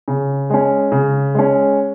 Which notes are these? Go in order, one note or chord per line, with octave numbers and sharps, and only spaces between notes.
C#3
G#3 C#4
C#3
G#3 C#4